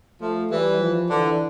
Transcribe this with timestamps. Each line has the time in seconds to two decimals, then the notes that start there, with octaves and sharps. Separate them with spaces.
0.21 F3 A3
0.50 E3 G3
0.80 F3
1.10 D3 E3